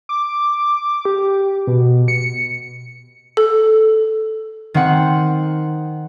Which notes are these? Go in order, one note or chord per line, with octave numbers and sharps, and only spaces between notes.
D6
G4
B2
C#7
A4
D#3 C4 F#5